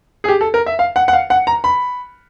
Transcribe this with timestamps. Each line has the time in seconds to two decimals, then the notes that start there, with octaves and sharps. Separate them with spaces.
0.24 G#4
0.28 G4
0.41 A4
0.54 A#4
0.66 E5
0.79 F5
0.96 F#5
1.08 F#5
1.13 F5
1.30 F#5
1.47 A#5
1.64 B5